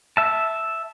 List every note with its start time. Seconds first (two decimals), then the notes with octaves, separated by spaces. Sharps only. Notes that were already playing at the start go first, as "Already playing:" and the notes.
0.17 E5 A5